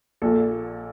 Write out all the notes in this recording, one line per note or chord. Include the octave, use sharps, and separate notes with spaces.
A#1 A#2 A4